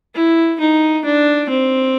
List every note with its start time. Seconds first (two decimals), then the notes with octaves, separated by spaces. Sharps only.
0.15 E4
0.60 D#4
1.05 D4
1.49 C4